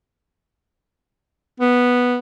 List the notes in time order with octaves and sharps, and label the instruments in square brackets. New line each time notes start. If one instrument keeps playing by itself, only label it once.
[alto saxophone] B3